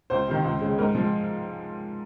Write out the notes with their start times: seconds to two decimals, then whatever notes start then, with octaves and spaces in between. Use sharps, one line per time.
0.10 C#2 C5
0.28 C3 D#3
0.45 C#2
0.61 C#3 G#3
0.78 G#2 A#4
0.95 F3 G#3